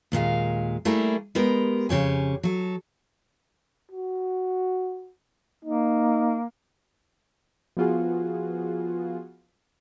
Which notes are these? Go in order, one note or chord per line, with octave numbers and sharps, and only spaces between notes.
D#2 A#2 G#3 F5
G3 A3 A#3 E4 G#4 A#4
G#3 B3 G4 A#4
F2 C#3 G4 C#5 G#5
F#3 A4
F#4
A#3 D#4
F3 B3 F4 F#4 G#4